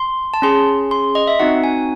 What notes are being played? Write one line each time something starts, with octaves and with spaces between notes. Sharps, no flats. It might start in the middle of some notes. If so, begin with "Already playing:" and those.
Already playing: C6
A5
C#4 G#4 C6
C6
D#5
E5
C4 D#4 F#4 F#5
G#5